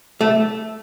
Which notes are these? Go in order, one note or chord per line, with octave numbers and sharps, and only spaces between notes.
A3